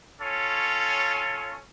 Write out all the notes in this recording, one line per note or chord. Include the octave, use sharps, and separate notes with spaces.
C#4 F4 A4 C#5